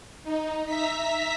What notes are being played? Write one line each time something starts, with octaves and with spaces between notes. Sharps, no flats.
D#4
E5 A#5 B6